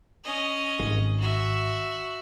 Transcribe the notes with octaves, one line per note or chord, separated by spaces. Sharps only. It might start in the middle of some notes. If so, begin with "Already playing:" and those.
C#4 D#5
G#1
F#4 E5